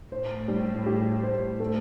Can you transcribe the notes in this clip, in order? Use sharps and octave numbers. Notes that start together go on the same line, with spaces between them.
A2 C5
G3
G4
C5
A3